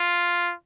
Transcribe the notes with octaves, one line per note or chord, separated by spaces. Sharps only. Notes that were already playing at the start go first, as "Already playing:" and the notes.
Already playing: F4